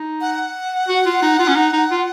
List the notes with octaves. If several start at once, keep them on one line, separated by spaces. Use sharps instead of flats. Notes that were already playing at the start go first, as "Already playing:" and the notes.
Already playing: D#4
F#5
F#4
F4
D#4
F4
C#4
D#4
D#4
F4